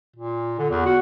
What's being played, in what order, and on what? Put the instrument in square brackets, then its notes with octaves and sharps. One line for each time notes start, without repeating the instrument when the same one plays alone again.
[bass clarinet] A#2
D3
E2
F#4